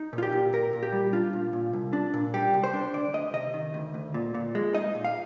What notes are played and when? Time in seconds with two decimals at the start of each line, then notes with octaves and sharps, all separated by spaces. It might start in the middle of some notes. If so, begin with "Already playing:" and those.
Already playing: D#4
0.13 A#2
0.18 F4
0.23 G4
0.32 A#2
0.53 A#2 A#4
0.73 A#2
0.83 G4
0.92 G3
1.13 D4 F4
1.33 A#2
1.53 A#2
1.73 C2
1.93 D4
2.14 A#2
2.34 G3 G4
2.54 C2
2.64 C5
2.73 D4
2.94 D2 D5
3.14 D2 D#5
3.34 C3 D#5
3.54 D#3
3.74 D2
3.94 D2
4.14 A#2
4.34 A#2
4.55 G#3
4.75 D#4 D#5
4.95 A#2
5.04 F5